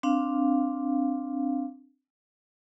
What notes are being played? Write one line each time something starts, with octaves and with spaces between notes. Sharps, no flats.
C4 D4 F5